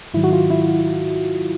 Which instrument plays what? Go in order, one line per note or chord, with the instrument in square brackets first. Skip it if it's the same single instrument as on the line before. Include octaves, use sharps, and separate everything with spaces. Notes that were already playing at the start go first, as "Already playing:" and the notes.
[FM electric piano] G#2 D#3 F#3 E4
F#4
F4
E4